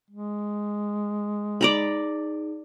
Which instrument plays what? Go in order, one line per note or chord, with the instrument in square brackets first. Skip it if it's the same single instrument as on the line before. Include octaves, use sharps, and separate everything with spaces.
[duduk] G#3
[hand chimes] D#4 G#4 [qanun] D5 A#5 B5